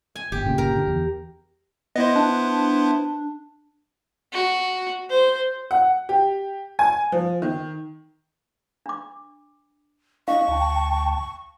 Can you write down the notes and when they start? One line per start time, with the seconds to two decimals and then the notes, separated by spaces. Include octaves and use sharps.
0.16 G#5
0.32 G1 G4
0.46 G1 A#2 C#3
0.58 A#4
0.76 D3
0.87 E2
1.96 B3 E4 C5 D#5
2.16 D4
4.32 F#4
5.09 C5
5.71 F#5
6.09 G4
6.79 G#5
7.12 F3
7.42 D#3
8.86 D4 D6
10.28 D4 E4 D#5 F5 C#6
10.48 D2 G5 A5